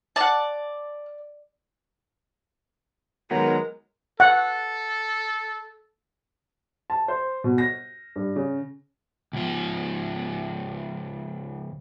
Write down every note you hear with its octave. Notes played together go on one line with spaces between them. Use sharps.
D5 F#5 A5
D#3 F#3 G#3 B3 A#4
A4 F#5
A5
C5
B2
A#6
G2
C#3
C#2 F3